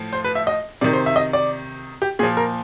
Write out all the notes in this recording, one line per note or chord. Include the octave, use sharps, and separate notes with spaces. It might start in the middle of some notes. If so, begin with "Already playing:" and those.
Already playing: A2 F3
C5
B4
E5
D#5
C3 D#3 D5
C5
E5
D#5
D5
G4
A#2 F3 G#4
A#4